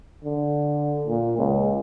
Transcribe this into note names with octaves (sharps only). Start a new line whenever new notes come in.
D3
A#2
C#2